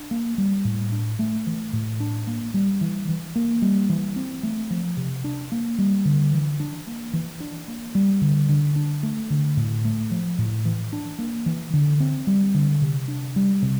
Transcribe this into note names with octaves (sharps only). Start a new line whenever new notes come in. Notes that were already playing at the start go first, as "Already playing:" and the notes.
Already playing: D4
A#3
G3
A2
D4
A3
E3
A2
D4
A#3
G3
E3
E3
A#3
G3
E3
C4
A3
F3
C3
D4
A#3
G3
D3
E3
D4
A#3
E3
D4
A#3
G3
D3
D3
D4
A3
D3
A2
A3
F3
A2
E3
D4
A#3
E3
D3
C4
G3
D3
C3
D4
G3
C3